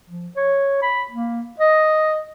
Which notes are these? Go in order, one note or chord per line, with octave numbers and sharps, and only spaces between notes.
F3
C#5
B5
A#3
D#5